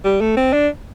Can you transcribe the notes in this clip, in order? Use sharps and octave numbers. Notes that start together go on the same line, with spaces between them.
G3
A3
C4
D4